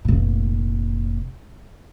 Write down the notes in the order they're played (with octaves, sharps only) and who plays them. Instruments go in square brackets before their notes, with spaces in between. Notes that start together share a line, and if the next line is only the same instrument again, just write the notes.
[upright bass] F1 A#2